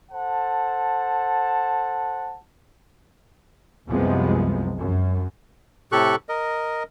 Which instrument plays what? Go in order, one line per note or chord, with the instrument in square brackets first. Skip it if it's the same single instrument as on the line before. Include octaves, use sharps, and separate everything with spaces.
[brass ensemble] A4 C5 F#5 A5
[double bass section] C2 F#2 C3 F3 G#3 B3
F#2
[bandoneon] A2 C3 G4 A4 C#6 F#6
A#4 D#5